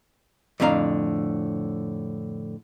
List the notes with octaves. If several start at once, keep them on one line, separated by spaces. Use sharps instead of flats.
F2 A2 D3 F5 A#5